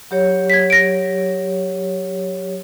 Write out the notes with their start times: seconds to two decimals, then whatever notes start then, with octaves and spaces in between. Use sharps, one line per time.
0.11 F#3 G4 C#5
0.50 G#6 B6
0.70 A#6 D7